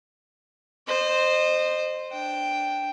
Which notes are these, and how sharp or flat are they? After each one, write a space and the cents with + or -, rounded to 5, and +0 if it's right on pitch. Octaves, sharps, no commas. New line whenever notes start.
C5 +0 D#5 -25
D4 +0 G5 +0